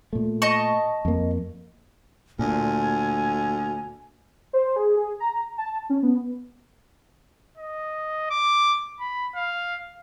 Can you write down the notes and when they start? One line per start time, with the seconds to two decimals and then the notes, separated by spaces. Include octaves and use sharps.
0.13 A#2 A3
0.42 D#5 A5 C#6
1.05 F2 A#3
2.39 D2 A#2 G#5
4.53 C5
4.76 G#4
4.97 G#4
5.20 A#5
5.58 A5
5.90 C#4
6.03 B3
7.57 D#5
8.31 D6
9.00 B5
9.35 F5